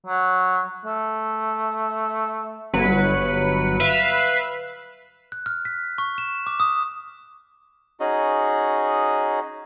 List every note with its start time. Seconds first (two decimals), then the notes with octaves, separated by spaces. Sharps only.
0.07 F#3
0.86 A3
2.73 G1 F#3 B4 C#7
3.80 B4 E5 F5
5.32 F#6
5.46 F6
5.65 B6
5.98 C#6
6.18 E7
6.47 D6
6.60 D#6
8.00 C#4 D#4 F#4 G#4 D#5